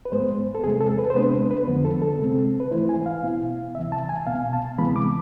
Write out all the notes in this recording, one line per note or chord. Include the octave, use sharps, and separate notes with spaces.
B4
G#2 G#3 B3 C5
A4
E2 C3 G#3 G#4
A4
B4
C5
C3 G#3 B3 D4 B4
B4
F2 D3 F3 B3
A4
A4
C3 G#3 C4
B4
G#2 E3 A3 E4 C5
G#5
F5
B2 B3 E4
D2 C3 E3 E5
A5
G#5
C2 B2 B3 F5
A5
D2 C3 E3 G#3 B3 B5
D6